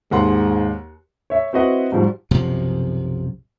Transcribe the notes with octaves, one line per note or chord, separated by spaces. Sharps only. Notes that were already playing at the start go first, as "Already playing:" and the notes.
D#2 G#2 F#5 C6
C#5 E5
C4 E4 F#4 B4 D#5 F#5
G#2 F3 G3 F#4
B1 F#2 C3 F3